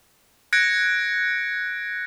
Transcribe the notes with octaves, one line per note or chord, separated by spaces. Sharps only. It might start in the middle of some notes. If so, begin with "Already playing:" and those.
F#6 G#6 A#6 C#7 D7